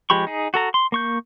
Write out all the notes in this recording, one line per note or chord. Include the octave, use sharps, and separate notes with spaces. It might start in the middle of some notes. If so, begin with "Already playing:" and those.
F3 G#3 G4 B5 C#6
D#4 G#4
F#4 A4 A#5
C6
A#3 C#6 G6